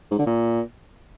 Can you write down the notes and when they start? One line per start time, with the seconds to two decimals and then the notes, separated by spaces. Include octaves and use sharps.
0.11 G#2
0.19 D3
0.26 A#2